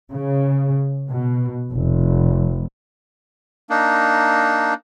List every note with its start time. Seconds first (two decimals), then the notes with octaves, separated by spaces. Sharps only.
0.11 C#3
1.08 B2
1.70 F1
3.70 A#3 D4 D#4